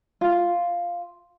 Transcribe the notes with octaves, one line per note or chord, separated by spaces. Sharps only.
F4